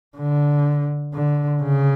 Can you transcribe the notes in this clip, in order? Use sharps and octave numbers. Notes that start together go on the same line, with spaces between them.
D3
D3
C#3